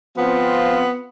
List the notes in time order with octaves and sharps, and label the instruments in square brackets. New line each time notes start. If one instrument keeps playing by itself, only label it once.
[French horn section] F3 C4 F4 [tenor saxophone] B3